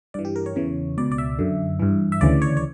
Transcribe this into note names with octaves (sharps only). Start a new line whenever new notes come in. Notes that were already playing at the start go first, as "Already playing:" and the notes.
G2 E3 D5
G4
A#4
C#5
E2 C#3 E3
C#2 B2 D5
D5
E5
F#2 D3
G2 E3
E5
D2 C#3 E3 D5
C#5
C#5